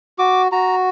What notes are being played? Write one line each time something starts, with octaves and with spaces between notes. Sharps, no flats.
F#4 D6
F#4 A#5